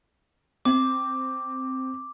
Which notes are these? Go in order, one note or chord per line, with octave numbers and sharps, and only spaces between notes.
C4 D6